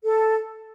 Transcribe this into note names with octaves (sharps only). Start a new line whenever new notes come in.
A4